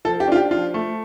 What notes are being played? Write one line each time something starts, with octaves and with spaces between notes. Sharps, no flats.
F3 A4
G4
D4 F4
G4
F3 F4
A3